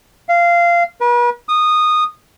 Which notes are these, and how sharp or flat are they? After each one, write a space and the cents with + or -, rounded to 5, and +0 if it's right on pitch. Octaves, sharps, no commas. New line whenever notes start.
F5 -15
B4 -40
D#6 -15